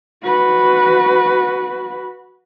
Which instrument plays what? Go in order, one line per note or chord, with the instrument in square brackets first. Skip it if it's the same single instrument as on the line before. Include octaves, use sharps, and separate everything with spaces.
[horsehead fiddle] F#4 B4